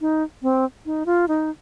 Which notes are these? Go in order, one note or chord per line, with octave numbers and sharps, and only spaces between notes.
D#4
C4
D#4
F4
D#4